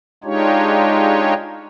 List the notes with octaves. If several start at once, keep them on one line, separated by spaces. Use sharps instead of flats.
G#3 D4 D#4 F4 G4 C#5